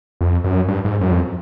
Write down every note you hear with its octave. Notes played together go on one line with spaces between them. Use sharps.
F2
F#2
G2
G#2
F#2
F2